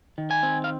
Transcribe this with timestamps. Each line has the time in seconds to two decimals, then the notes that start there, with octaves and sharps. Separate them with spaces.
0.18 D#3
0.31 G#5
0.43 C4
0.64 F5